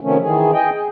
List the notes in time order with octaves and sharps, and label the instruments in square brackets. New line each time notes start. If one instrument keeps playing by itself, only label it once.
[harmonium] C3 D#3 F3 A3 C#4
D#3 E3 G#4
G#4 D#5 G5
G#4